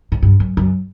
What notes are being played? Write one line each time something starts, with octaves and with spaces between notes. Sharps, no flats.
A2
G2
F#2
F#2